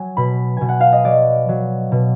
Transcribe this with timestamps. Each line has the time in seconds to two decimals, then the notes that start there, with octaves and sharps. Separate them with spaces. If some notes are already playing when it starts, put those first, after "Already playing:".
Already playing: F#3 G#5
0.17 B2 B5
0.57 B2 G#5
0.69 F#5
0.80 F5
0.92 D#5
1.04 F#3 D5
1.49 F#3
1.92 B2